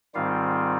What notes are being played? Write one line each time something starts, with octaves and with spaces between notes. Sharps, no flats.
G#2 D#3 G3 C4 F4 F5